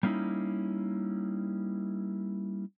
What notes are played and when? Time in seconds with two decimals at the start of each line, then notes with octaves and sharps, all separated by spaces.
0.03 G3 A#3 C#4 D#4 E4